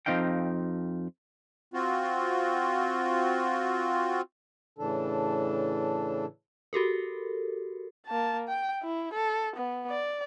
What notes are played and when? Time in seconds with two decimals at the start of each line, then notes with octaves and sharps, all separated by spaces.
0.06 F2 B3 C4 D#4 F5 G5
1.74 C4 F4 F#4
4.79 A2 C#3 E3 D4 A4
6.73 F#4 G4 A4 A#4
8.07 A#3 A5
8.48 G5
8.83 E4
9.14 A4
9.56 B3
9.90 D5